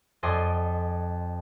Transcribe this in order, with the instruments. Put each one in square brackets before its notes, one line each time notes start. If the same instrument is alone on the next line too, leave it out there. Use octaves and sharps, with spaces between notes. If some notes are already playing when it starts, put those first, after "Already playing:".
[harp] F2 D5 D#5 G#5 C6